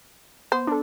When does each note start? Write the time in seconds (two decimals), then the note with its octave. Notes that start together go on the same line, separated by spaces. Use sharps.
0.52 B3 C5
0.67 D4 A4